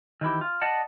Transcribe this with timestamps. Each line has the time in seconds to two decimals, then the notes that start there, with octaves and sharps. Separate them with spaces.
0.21 D#3 E3 E4 G4
0.41 F4
0.61 D5 D#5 F#5 A5